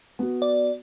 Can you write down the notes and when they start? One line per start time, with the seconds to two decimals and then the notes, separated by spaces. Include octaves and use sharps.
0.19 B3 F#4
0.42 D5